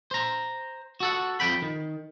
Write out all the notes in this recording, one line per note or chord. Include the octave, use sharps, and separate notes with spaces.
C5 A#5
F#4 A4 F#5
F2 G5 B5
D#3